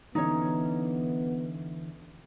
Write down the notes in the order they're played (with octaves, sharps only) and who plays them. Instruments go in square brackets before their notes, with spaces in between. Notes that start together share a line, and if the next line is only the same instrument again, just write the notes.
[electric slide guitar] D3 E3 C#4 [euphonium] B3 [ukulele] D#4 C#5